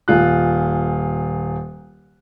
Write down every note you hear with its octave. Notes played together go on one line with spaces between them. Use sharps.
D#1 F4 F#6